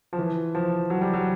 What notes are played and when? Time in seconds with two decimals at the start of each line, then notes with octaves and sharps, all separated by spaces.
0.13 F3
0.19 E3
0.55 F3
0.90 F#3
1.01 G3
1.14 F#3